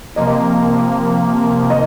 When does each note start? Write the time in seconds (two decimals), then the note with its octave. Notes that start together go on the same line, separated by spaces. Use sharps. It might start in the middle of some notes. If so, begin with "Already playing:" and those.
0.16 C3 F3 A#3 D#5
1.70 D#3 D#5